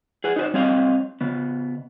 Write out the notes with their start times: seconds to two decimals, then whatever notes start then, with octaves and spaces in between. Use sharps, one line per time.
0.24 G#4 B4 F#5
0.36 D#4 F#4 B4 C5
0.54 G3 C4 C#5 D#5 F5
1.21 C#3 B3